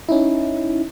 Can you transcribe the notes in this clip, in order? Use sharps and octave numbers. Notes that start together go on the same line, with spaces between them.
C#4 D#4 E4